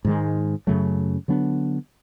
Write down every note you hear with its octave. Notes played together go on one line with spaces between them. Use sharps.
G#2 D#3 G#3
F#2 C#3 F#3 A3
D3 F#3 B3 D4